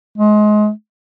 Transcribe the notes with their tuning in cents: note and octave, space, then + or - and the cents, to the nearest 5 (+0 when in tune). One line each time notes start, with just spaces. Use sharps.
G#3 +25